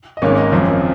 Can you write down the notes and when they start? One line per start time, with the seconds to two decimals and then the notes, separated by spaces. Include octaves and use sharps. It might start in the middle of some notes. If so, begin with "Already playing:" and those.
0.17 D#5
0.22 G#1 G#2 D#3 A#3 C#4 C#5
0.37 D#5
0.52 G#1 F#2 F3 C4